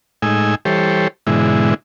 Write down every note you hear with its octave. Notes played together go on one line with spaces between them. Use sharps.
A2 G#3 D#4 G#5 E6
E3 G3 G4 A4 C5 C#5
G#2 B2 D3 E3 G#3 E4